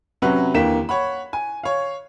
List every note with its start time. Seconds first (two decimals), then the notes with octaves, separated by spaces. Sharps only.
0.22 C3 F#3 C#4 F#4 B4 F#6
0.54 D#2 D3 E3 A#3 B6 E7
0.89 C#5 F#5 B5
1.33 G#5
1.63 C#5 F5